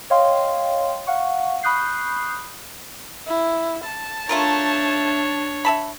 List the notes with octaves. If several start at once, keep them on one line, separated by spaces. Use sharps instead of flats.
C#5 D#5 F5 G5 C6
F5 F#5 C#6
B5 C#6 D#6 F#6 G6 C7
E4
A5
A3 D4 F4 A#4 C#5
E5 A5 B5